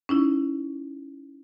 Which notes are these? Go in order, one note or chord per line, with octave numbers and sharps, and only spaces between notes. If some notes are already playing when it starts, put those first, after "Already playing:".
C#4 D#4 E4